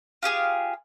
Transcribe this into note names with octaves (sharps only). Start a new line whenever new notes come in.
F4 G4 G#4 F5